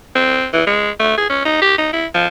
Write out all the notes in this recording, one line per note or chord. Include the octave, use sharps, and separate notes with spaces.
C4
E3
G#3
A3
G#4
C#4
D#4
G4
D#4
E4
F3